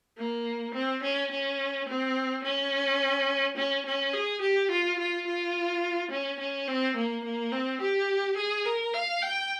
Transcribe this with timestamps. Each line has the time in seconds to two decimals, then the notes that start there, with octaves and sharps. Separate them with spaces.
0.17 A#3
0.74 C4
1.03 C#4
1.32 C#4
1.88 C4
2.44 C#4
3.57 C#4
3.86 C#4
4.13 G#4
4.41 G4
4.71 F4
4.99 F4
5.27 F4
6.11 C#4
6.39 C#4
6.67 C4
6.96 A#3
7.25 A#3
7.52 C4
7.81 G4
8.37 G#4
8.66 A#4
8.94 F5
9.22 G5